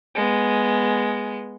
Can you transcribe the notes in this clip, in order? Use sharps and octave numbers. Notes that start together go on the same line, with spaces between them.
G#3 B3